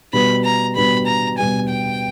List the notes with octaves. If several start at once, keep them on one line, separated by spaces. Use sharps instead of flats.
B2 G3 B3 B5
A#5
B2 G3 B3 B5
A#5
B2 G3 B3 G#5
G5